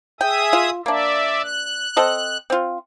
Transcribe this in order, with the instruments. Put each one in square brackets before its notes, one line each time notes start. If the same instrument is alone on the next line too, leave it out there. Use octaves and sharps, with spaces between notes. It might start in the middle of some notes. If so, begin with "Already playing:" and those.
[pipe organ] G#4 E5 D#6 [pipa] G5
[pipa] F4
[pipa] A#3 D4 [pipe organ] D5 E5
[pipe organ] F#6
[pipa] C4 A4 D#5
C4 F4